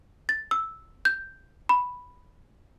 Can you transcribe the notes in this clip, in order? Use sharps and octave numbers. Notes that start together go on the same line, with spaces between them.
A6
E6
G6
B5